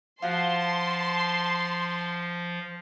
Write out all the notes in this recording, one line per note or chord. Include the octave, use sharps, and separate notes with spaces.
F3 F4 F#4 A5 C6